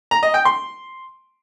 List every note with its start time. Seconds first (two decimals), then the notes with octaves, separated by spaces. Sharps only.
0.11 A#5
0.23 D#5
0.34 G5
0.45 C6